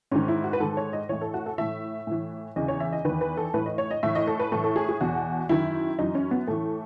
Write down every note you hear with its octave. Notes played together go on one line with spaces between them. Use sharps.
G#2 D#3 C#4
E4
F#4
B4
G#2 D#3 A4
C#5
D#5
A2 E3 C#5
A4
F#4
A4
A2 E3 E5
A2 E3
E2 C#3 E3 D#5
C#5
E5
D#5
E2 D#3 B4
B4
A4
A2 E3 B4
D#5
C#5
D#5
A2 E3 E5
D#5
A4
B4
A2 E3 A4
A4
G#4
G#4
E2 B2 F#4
F#2 D#3 E4
F#2 E3 D#4
C#4
B3
A2 E3 A3